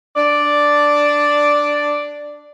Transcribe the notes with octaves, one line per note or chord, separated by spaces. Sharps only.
D4 D5